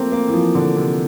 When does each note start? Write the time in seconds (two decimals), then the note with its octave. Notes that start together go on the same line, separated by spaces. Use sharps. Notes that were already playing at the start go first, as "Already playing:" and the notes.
Already playing: F3 A3 A#3 C4
0.12 A#3
0.28 E3
0.34 F3
0.55 D3
0.76 C3